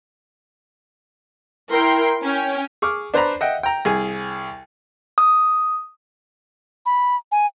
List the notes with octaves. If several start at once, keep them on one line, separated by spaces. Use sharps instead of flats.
E4 A#4 G5 C6
C#4 G5
G#4 C#6 D6 F6
D4 B4 C5 D5 A#5 B5
D#5 E5 F#5 G5
G5 A#5
C2 G#4 G#5
D#6
B5
G#5